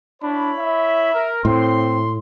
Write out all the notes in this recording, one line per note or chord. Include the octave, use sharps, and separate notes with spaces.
D4 E4 C#5 B5
E5
A#4
A2 C4 C6